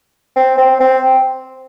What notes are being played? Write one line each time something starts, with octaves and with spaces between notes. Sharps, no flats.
C4
C4
C4